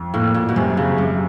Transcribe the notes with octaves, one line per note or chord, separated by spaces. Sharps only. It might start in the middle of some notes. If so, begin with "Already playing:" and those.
Already playing: F2
A2 A#3
A#2
B2
F#2 C3
C#3
F#2 C3